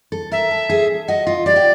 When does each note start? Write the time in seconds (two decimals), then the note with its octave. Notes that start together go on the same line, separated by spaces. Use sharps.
0.12 A4
0.31 A#4 E5
0.51 A4
0.69 G#4
1.08 F#4 D#5
1.27 F4
1.46 G4 D5
1.56 G4